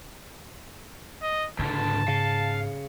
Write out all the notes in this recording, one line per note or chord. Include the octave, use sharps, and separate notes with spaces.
D#5
C#2 G#2 D3 A5
C#3 F5